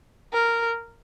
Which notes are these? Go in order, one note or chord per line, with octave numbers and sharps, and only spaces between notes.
A#4